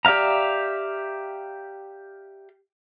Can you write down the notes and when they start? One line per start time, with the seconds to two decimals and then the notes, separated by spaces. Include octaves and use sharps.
0.05 G4 D5 E5 F5 A#5